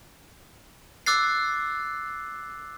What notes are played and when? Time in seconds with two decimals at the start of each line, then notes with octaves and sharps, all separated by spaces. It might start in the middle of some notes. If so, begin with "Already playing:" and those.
1.06 D6 E6 F#6 A6 C7